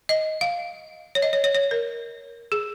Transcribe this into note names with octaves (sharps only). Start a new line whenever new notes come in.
D#5
F5
C#5
D#5
C#5
C#5
C#5
A#4
G#4